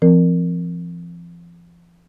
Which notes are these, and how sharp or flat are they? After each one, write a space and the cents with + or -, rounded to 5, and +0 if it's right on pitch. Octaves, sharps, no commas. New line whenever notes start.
F3 -30 C4 +0 A#4 -15